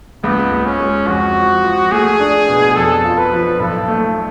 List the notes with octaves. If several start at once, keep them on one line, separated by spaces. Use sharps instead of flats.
C#2 B3
C#2
C#4
G#3
F2 F#4
F3
F3
A3 G#4
D4
B2
F2 A4
F4
B4
F3
B1 A4
A3